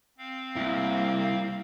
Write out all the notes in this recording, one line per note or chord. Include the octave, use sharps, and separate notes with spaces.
C4 F5
C2 G3 A#3 E4